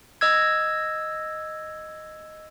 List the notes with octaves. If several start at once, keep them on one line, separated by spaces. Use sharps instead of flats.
D#5 E6 G#6